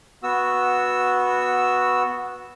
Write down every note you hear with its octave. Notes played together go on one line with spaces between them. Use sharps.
B3 F#4 E6